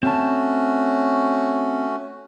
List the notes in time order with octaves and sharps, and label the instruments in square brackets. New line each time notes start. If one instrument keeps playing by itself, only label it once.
[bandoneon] A3 C#4 F#4 [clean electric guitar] C4 A5